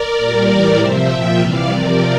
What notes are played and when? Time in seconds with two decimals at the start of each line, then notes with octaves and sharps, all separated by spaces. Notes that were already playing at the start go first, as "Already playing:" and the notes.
Already playing: A#4 D5
0.17 A#2 G3
0.47 A2 E3 G3 A#4 D5
0.78 C3 F3 C5 E5
1.08 A#2 F3 E5 G5
1.38 C3 E3 G3 D5 F5
1.68 C3 F3 A#4 D5